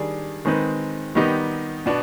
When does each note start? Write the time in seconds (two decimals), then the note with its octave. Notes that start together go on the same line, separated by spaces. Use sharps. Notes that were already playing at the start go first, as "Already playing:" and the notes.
Already playing: D#3 G3 D4 G#4 D5
0.45 D#3 G#3 C4 D#4 B4
1.15 D#3 G3 B3 D#4 G4
1.86 B2 B3 D4